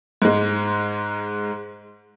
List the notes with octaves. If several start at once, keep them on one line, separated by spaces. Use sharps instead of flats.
G#2 G#3